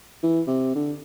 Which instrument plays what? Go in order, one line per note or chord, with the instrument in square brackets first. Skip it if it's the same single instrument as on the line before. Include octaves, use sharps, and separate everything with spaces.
[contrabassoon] E3
C3
D3